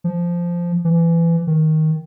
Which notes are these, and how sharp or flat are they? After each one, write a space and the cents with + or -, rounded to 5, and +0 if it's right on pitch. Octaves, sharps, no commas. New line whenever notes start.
F3 -10
E3 +25
D#3 +10